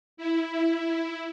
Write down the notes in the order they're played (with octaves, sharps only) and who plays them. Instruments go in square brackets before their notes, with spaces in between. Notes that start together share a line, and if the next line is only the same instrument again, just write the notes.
[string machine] E4